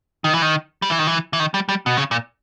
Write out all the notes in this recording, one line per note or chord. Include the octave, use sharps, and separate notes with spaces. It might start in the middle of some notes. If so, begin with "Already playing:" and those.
D#3
E3
D#3
G3
E3
D#3
E3
E3
D#3
G3
G3
B2
C#3
A#2